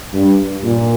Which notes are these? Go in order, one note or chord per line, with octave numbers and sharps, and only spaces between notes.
G2
A#2